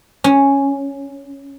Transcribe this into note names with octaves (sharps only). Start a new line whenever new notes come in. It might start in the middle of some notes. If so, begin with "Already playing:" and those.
C#4